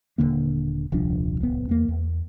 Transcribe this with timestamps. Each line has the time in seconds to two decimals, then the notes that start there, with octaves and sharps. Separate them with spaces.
0.18 D#1 C#2 D3 A#3
0.92 D#1 C2 F3 D4
1.41 D1 C2 B3
1.69 E2 A#3
1.88 E2